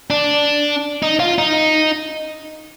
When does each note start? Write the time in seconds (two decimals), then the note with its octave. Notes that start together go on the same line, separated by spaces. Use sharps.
0.10 D4
1.02 D#4
1.20 F4
1.38 D#4